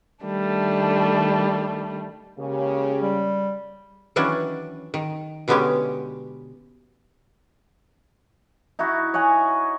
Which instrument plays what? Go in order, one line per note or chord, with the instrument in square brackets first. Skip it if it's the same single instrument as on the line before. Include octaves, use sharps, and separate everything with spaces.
[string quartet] D#3 G3 A3 D4
[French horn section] C#3 [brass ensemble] G#3 A#3 G4
[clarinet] G3
[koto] D#3 E3 F#3 C#4 D4
D#3
B2 D3 G#3 B3 C#4 G4
[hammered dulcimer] D#4 E4 F#4
C#5 D#5 F#5 G#5